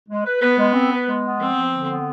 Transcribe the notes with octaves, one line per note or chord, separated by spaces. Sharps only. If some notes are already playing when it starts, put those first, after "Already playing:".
G#3
B4
B3 B4
G#3
C4
B4
G#3
B3
F3 C4
F3
D3
B3